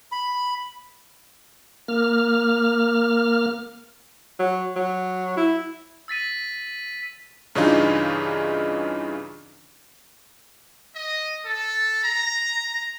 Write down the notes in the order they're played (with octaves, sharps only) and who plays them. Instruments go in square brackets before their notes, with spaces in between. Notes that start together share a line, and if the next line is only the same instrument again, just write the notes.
[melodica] B5
[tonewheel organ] A#3 F6
[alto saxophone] F#3
F#3
E4
[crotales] E6 A6 B6 D#7
[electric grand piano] G2 C#3 E3 D4 D#4 F4
[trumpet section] D#5
A4
A#5